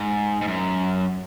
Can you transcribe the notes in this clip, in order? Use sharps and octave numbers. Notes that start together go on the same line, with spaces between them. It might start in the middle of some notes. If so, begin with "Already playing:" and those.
Already playing: G#2
G#2
F#2